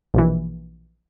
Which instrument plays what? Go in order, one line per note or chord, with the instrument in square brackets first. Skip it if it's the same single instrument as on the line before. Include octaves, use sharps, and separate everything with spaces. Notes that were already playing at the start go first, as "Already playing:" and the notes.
[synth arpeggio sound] A#1 B2 E3